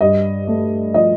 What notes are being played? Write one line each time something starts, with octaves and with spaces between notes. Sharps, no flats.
G2 D#5
A3
F3 D#5